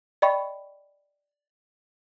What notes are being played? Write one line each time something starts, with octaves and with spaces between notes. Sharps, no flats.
D5 D#5 G5 B5 C#6